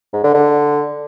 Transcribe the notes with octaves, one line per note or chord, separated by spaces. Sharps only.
G#2
D3
D3